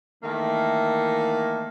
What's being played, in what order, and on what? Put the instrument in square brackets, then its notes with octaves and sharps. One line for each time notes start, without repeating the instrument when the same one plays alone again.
[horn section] D#3 E3 A3 A#3